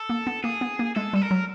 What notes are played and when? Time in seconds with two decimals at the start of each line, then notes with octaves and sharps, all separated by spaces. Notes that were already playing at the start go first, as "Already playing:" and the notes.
Already playing: A4
0.10 A#3
0.27 B3
0.44 A#3 G#4
0.61 B3
0.79 A#3
0.96 G#3 A4
1.13 G3 A4
1.22 A#4
1.31 F#3